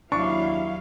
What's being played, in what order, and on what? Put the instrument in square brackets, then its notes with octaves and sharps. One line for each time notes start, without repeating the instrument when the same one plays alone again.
[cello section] D#2 F#3 F5 [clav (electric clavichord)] D4 [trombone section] E4 [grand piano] C#6